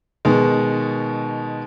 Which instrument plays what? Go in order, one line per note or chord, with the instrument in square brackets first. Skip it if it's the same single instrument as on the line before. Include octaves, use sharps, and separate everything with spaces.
[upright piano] B2 D#3 G#3